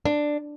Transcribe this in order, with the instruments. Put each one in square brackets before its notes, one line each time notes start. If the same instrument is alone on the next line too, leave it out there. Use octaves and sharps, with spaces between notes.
[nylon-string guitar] D4